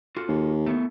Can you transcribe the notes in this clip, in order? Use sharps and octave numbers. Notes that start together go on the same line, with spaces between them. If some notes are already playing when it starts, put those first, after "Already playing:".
F4 F#4 A4
D#2
A3 B3 E4